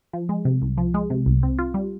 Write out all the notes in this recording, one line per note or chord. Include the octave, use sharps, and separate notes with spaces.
F3
G#3
C3
C2
F3
G#3
C3
C2
C4
F4
G3